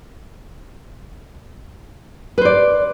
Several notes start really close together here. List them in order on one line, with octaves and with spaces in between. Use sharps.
B4 C5 D5